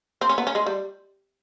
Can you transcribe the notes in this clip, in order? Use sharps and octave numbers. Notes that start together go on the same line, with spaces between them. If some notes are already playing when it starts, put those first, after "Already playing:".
C4
C#4
B3
C#4
G#3
G3